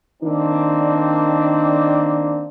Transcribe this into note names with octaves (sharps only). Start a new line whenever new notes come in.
D#3 A#3 C4 D4